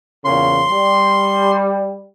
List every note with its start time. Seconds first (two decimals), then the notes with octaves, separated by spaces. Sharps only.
0.25 E2 A#2 C#3 C6
0.70 G3